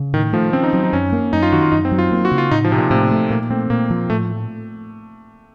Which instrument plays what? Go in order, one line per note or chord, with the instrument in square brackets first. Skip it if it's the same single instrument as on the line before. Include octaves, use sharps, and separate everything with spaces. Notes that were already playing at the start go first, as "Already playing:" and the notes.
Already playing: [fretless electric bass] C#3
[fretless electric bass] A2 [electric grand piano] D#3
[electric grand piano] F3 [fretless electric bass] A3
[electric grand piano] C4 [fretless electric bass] C#4
[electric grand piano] D#4
[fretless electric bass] F#3
[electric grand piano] D#4
[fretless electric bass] F#2 [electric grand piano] C#4
[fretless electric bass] A#3
[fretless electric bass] F#2 [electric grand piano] D#4
[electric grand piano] F4
[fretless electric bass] D#3 [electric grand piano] F#4
[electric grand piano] F4
[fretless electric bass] F#2 [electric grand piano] D#4
[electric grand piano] C4
[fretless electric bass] F#3
[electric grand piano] F4
[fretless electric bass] A#3
[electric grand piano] F#4
[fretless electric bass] C#3
[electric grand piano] F4
[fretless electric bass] A2 [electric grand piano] D#4
[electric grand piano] F3
[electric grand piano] C3 [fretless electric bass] C4
[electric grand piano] A#2
[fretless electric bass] A2 [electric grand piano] C3
[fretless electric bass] A3
[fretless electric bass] A#2 [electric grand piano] A#3
[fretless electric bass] A3 [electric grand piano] C4
[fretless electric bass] A#2 [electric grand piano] A#3
[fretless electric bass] F3
[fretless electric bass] A2 [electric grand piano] A3